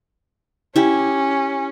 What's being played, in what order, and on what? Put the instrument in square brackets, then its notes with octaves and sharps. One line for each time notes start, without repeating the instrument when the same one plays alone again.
[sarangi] C#4 [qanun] E4 G4